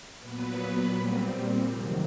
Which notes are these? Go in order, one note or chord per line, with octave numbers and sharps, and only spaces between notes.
A#2 F#3 B3 B4
A#2 G3 C4
F2 C3 D#3 F#3